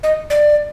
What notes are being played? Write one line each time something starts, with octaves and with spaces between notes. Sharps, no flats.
D#5
D5